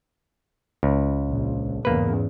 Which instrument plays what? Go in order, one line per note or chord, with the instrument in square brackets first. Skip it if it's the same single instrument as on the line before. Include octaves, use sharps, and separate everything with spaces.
[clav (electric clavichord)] C#2
[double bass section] A#1
[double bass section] E2 G#2 C#3 [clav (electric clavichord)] A#3 B4